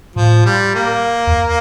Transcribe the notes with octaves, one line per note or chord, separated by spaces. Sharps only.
A2 F3
G3
A#3
E2